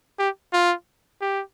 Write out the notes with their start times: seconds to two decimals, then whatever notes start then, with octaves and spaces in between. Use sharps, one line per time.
0.19 G4
0.53 F4
1.21 G4